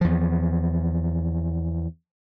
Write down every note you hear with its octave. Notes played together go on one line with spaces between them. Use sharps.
E2 F3